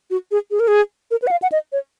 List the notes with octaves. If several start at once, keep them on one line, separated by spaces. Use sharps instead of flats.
F#4
G#4
G#4
A#4
G#4
A#4
B4
F#5
F5
F#5
D#5
C#5